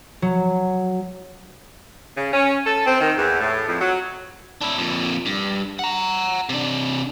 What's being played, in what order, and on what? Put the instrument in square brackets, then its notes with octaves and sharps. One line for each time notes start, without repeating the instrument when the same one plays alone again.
[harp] F#3
[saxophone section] C#3
C#4
A4
C4
D#3
E2
A2
F2
F#3
[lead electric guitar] D4 E4
F2 A#2
G2
F#5 A#5
C3 D4